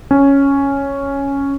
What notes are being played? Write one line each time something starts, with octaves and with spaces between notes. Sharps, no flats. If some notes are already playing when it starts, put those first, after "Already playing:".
C#4